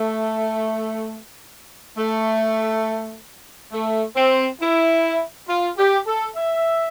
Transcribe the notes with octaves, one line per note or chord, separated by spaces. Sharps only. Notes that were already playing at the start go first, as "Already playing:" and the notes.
Already playing: A3
A3
A3
C4
E4
F4
G4
A4
E5